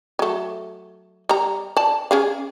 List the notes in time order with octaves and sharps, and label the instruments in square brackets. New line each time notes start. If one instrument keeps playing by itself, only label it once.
[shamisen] F#3 A3
G3 A#5
D5 A5
C#4 G#4 F5